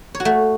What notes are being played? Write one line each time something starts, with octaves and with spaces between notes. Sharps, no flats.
C#5
F#4
A3